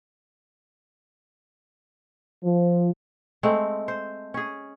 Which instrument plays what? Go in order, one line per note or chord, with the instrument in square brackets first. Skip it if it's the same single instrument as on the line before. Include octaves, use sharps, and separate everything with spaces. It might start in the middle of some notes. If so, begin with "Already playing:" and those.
[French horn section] F3
[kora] G#3 A3 C4
C5
C#4 G#4